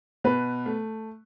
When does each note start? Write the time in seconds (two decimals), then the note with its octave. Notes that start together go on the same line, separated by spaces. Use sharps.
0.24 B2 B4
0.66 A3